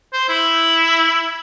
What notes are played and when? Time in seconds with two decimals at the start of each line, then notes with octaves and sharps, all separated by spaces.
0.13 C5
0.29 E4